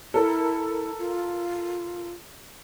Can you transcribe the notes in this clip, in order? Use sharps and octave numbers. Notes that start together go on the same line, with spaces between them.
E4 A4 A#4
F4